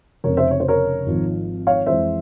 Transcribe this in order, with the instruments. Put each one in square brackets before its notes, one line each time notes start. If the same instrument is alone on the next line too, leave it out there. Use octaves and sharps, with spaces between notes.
[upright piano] F1 F2 C#3 A#4 C#5
C5 E5
C#5
C5
A#4 C#5
G#1 G#2 F3
C#5 F5
F2 E3 G#3 C5 E5